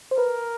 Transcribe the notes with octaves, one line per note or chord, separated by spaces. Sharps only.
C5
A#4 B4